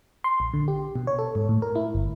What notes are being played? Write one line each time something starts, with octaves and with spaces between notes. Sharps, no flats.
C6
A#1
D3
G4
B2
C#5
A4
G#2
A2
A#4
E4
G1